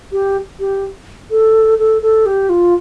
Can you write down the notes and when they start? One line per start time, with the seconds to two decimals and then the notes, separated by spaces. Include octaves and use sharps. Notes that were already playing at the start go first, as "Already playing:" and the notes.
0.12 G4
0.60 G4
1.31 A4
1.78 A4
2.02 A4
2.26 G4
2.49 F4